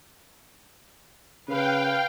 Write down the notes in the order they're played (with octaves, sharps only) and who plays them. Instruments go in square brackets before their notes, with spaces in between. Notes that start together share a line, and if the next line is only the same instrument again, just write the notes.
[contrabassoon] C#3 [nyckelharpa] B4 [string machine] F5 G5